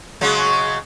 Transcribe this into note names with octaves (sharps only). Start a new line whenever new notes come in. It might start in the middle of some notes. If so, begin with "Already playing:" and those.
C#3 F#3 G#3